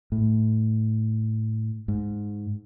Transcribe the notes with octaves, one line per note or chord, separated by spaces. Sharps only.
A2
G#2